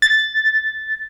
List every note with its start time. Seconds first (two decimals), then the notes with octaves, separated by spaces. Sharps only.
0.02 A6